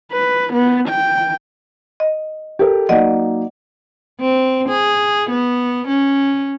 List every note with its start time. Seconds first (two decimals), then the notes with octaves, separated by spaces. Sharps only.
0.12 B4
0.53 B3
0.89 G5
2.00 D#5
2.59 G4 A4 A#4
2.89 F#3 A#3 D#4 D5 D#5 F#5
4.20 C4
4.69 G#4
5.31 B3
5.88 C#4